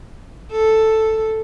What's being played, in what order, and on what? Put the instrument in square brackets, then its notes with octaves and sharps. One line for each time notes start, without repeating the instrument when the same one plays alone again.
[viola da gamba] A4